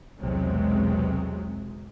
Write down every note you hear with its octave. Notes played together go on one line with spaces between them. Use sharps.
B1 E2 C3 F#3 G#3